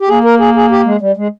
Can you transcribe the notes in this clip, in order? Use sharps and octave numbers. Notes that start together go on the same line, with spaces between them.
G4
A#3 G#4
A#4
G#4
G#4
G4
G#3
G3
G#3